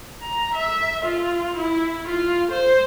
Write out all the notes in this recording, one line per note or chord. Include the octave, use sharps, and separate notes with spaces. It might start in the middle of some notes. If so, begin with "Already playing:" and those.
A#5
E5
F4
E4
F4
C5